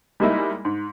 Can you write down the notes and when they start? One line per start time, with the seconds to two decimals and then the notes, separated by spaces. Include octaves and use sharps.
0.20 G3 G#3 A#3 D#4 E4
0.65 G#2